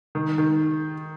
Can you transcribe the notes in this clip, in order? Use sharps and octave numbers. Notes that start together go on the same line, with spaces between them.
D#3
D#3